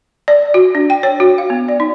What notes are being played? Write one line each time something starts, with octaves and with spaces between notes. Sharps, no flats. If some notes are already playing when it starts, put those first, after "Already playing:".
D5
F#4
D4
G5
C#5
F#4
F5
B3
D5
D#4